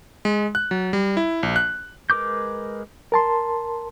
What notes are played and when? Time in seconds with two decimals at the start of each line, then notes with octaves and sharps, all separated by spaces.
0.25 G#3
0.55 F#6
0.71 F#3
0.93 G3
1.17 E4
1.43 A#1
1.56 F#6
2.10 G#3 A#4 B4 D6 G6
3.12 A#4 A5 C6